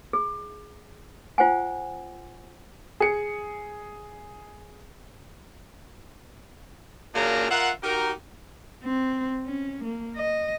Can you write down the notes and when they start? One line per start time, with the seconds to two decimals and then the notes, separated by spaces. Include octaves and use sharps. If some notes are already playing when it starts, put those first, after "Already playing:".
0.13 G#4
1.38 F4 C5 F#5 G#5
3.00 G#4 C#7
7.15 F#2 A#2 C#3 A#3 D4 A#5
7.50 F4 A#4 E5 F#5
7.83 D#4 F#4 G4 A#4
8.83 C4
9.45 C#4
9.84 A#3
10.17 D#5